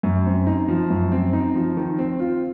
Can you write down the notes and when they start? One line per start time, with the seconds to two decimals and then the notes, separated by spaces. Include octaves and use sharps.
0.03 F#2
0.26 C4
0.47 D#4
0.68 F3
0.90 F#2
1.12 C4
1.33 D#4
1.55 F3
1.77 D#3
1.99 C4
2.20 F4